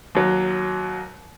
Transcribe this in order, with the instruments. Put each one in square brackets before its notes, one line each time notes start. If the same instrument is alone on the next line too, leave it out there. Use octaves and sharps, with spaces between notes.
[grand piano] D#2 F#3